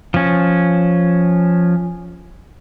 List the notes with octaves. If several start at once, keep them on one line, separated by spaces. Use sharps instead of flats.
F3 C#4